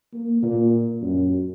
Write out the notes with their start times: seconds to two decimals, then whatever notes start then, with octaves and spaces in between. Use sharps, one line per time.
0.13 A#3
0.43 A#2
1.02 F#2